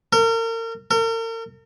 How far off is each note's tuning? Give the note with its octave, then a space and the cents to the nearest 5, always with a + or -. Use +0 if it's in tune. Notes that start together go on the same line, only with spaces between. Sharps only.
A#4 -35
A#4 -40